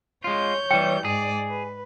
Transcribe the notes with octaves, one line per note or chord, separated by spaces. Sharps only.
G#3 F4 C#5 G6
E3 G3 G5
G#2 G#4 D5
B4